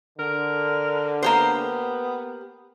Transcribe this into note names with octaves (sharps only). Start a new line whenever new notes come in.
D3 A#4
A#3 B3 G4 C5